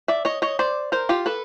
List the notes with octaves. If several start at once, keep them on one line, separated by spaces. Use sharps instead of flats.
D5 E5
C#5 D#5
C#5 D#5
C5 D5
A#4 C5
F4 G4
A4 B4